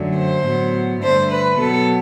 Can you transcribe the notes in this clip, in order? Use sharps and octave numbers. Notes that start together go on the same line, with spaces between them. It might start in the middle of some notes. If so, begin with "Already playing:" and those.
Already playing: F#2 D3 F#3 A3
C5
A2 F#3 B3
G2 D3 A3 C5
B4
B2 F#3 B3 A4